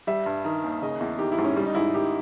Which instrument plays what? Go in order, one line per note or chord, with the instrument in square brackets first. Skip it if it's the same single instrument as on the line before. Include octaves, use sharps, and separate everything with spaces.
[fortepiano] G3 [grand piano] E5
[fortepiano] G2
D#3
D#2
[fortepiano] C#3 [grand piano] D#5
[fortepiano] E2
[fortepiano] D#3 [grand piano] G4
[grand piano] E4
[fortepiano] G#2
[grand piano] C#4
[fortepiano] G3 [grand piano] C#4
[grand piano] D#4
[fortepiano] G#2 [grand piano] E4
[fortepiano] D#3 [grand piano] G4